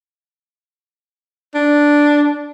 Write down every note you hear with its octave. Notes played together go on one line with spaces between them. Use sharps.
D4